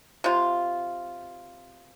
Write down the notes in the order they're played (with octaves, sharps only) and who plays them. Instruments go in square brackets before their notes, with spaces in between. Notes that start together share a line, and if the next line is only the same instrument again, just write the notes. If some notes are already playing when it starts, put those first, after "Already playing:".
[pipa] C3 F4